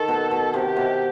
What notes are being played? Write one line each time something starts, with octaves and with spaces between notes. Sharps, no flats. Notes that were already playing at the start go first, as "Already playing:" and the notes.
Already playing: D#3 A4
B2
B2
C3 G4
B2